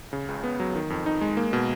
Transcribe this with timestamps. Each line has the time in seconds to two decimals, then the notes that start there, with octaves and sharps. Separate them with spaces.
0.13 C#3
0.28 C#2
0.44 B3
0.60 F#3
0.75 D#3
0.90 F2
1.06 D#4
1.21 G#3
1.37 A#3
1.53 B2